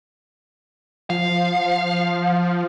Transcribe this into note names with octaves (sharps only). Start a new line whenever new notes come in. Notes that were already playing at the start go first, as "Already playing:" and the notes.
F3 F5